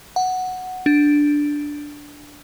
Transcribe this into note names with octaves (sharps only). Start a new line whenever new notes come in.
F#5
D4